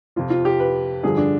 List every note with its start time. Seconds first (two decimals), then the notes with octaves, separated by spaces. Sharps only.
0.16 F2 C3 F3 F4
0.30 F4
0.45 G4
0.60 B4
1.03 G2 D3 F3 G#4
1.17 D4